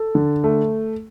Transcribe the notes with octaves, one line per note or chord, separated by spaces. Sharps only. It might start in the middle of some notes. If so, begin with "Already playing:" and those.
Already playing: A4
D3
A3